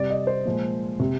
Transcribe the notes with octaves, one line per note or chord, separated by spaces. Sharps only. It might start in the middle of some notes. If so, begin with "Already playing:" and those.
Already playing: C3 G3 D5
D#5
C5
A#2 F3 G#3
C3